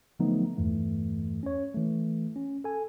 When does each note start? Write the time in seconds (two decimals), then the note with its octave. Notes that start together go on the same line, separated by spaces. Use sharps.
0.19 D3 F3 F#3 A3 B3 D#4
0.57 E2 G2 E3 A3
1.43 C#4 C#5
1.75 E3 A3
2.36 C#4
2.64 A4 G#5